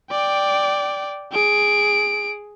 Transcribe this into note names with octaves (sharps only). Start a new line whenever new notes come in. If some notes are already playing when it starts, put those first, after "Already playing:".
D5 G5
G#4 D7